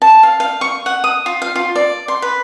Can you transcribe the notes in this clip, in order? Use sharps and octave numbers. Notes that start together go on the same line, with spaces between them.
A5
F5
F5
C#6
F#5
D#6
F4
F5
F4
D5
C6
B4